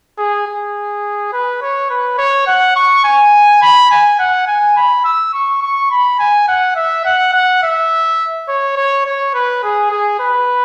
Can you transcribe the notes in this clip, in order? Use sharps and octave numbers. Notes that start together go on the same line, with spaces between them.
G#4
G#4
B4
C#5
B4
C#5
F#5
C#6
G#5
B5
G#5
F#5
G#5
B5
E6
C#6
C#6
B5
G#5
F#5
E5
F#5
F#5
E5
C#5
C#5
C#5
B4
G#4
G#4
B4